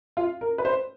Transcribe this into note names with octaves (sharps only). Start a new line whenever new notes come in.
F4
A#4
B4
C5